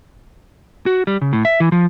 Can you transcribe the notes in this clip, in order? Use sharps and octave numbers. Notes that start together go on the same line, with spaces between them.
F#4
G3
C#3
A2
E5
E3
F3